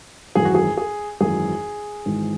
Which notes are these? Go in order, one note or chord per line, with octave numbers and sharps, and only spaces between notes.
G#1 F#2 E3 G#4
F#4
G#4
G#4
G#1 F#2 E3 G#4
G#1 G#2 E3